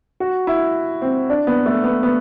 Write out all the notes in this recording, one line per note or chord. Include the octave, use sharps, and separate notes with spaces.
F#4
E4
C4
D4
B3
A3
B3
B3